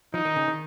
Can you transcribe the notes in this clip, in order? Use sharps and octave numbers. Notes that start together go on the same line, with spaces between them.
F3 D#4
D#3
C#3
D#3